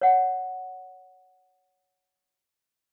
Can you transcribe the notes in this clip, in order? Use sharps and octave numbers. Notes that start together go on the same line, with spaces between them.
C#5 F#5